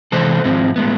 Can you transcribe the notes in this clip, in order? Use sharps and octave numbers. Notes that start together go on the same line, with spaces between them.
C3 E3 G#3 A4 C5
G#2 F3 G#3 C4
A2 G#3 B3